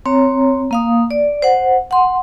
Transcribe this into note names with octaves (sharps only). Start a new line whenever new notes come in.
C4 C#5 A#5
A#3 F5 D#6
D5
C5 F#5
F#5 C6